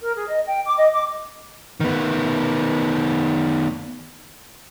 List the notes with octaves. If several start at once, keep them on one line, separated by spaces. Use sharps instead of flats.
A#4
G#4
D#5
G5
D6
D#5
D6
D#3 B3